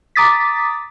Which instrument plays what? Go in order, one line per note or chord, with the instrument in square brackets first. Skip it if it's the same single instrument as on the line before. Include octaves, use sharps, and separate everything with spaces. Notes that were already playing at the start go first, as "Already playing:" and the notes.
[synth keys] A#5 D6 D#6 A6 B6